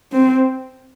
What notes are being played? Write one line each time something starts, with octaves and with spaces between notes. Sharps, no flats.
C4